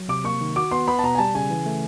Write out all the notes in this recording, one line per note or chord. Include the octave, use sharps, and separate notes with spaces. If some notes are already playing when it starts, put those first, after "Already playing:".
Already playing: F#3
C3 D6
A#3 C#6
D#3
F#4 D6
B3 C6
B3 B5
A5
B2 A#5
G#5
G3 A5
C#3 G#5
E3
A3